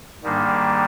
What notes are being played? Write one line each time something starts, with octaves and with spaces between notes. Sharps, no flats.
G#2 D#3 G3 A#3 D4